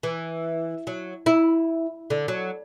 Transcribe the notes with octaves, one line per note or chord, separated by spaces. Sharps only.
E3
F#3
E4
D3
F#3